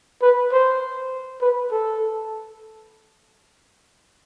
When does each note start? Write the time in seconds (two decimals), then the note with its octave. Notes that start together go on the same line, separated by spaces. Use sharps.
0.22 B4
0.53 C5
1.42 B4
1.71 A4